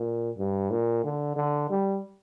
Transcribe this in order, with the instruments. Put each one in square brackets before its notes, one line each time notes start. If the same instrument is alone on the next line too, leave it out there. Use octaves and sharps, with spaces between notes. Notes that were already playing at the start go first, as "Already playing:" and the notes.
Already playing: [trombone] A#2
G2
A#2
D3
D3
G3